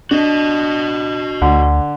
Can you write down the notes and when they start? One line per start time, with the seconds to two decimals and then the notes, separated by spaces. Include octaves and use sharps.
0.11 D4 F#4 D#5
1.42 D2 D3